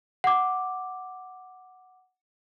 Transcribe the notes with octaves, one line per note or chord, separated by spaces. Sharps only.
F#5 D6